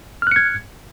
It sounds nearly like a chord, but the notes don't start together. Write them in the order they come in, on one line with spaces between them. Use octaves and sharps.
F6 F#6 C#7 G#6